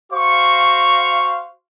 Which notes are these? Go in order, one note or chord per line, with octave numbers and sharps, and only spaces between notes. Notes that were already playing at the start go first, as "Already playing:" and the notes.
F#4 C5 F5 C#6